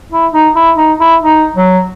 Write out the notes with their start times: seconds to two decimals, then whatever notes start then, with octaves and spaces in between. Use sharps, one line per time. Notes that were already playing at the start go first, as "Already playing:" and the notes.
0.11 E4
0.34 D#4
0.56 E4
0.78 D#4
1.00 E4
1.23 D#4
1.56 F#3